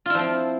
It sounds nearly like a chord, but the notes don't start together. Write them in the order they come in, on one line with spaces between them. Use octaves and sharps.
F4 E4 F3 C4